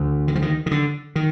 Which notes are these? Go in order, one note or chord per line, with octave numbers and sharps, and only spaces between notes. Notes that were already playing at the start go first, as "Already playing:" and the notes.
Already playing: D2 D3
D#3
F3
D#3
D#3
D3
D#3